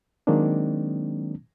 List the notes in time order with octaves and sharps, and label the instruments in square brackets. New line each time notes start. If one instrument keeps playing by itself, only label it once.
[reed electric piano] D#3 F#3 G#3 A#3 C4 D4